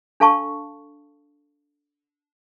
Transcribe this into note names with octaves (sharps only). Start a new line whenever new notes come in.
D4 A4 F5 A5 C#6